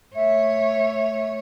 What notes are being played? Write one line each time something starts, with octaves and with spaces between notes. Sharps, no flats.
A3 C#5 E5